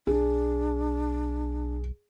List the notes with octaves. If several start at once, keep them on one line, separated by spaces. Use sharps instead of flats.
B1 D4 G#4